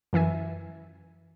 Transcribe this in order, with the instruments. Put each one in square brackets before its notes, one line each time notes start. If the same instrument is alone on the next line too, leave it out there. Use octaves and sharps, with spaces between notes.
[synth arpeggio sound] F#2 E3 E5 G#5